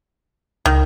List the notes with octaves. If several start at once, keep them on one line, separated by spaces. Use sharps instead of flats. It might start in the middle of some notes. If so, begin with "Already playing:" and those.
C#2 D#3